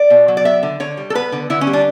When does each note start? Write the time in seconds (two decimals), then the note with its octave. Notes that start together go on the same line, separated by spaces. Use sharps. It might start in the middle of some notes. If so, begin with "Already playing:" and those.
Already playing: D5
0.10 B2
0.28 F#3
0.37 D5
0.45 B3 E5
0.63 D3
0.80 D3 C#5
0.97 G3
1.10 A4
1.15 B3 B4
1.32 D3
1.50 D3 E4
1.61 C#4
1.67 G3
1.73 D4